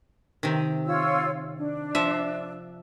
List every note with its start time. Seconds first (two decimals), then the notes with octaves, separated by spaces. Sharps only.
0.43 C3 D#3
0.86 F4 C#5 E6
1.57 D4
1.95 F3 E5